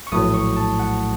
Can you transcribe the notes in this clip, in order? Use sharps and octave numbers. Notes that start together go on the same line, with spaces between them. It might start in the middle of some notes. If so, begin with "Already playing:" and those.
C#6
A#1 A2 F#3 A3 D#6
C#6
A5
F#5